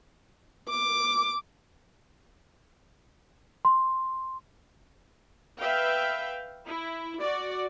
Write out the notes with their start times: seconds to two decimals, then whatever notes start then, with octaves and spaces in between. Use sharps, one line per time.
0.69 D6
3.65 C6
5.59 B4 E5 F5 G5
6.66 E4
7.21 F#4 D5